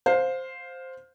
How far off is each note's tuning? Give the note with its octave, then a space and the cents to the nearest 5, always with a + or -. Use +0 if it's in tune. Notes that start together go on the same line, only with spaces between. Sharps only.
C5 +0 F5 +20